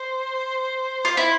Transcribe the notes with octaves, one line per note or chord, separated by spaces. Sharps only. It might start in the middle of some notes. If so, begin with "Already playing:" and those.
Already playing: C5
F4
E4